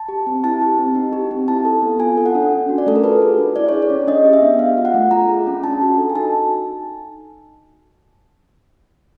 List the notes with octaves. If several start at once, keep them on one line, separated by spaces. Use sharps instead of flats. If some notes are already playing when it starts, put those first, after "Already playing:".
Already playing: A5
G4
C4
E4 A5
G4
C4
D#4
G4
C4
E4 A5
A4
B3
F4 G#5
A4
F#5
D4
C#4
F#4
D5
A3 A4
A#4
F4 B4
G#4
D4
E4 D5
G#4 C#5
D5
C#4
D4 D#5
G4
E5
B3
D4 F5
F4
F#5
A3
F4 A#5
G#4
C#4
D4 A5
F#4
A4
G#5
D#4 A5